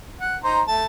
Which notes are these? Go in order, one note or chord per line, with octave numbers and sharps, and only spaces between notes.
F#5
D#4 C5 A#5
A3 A5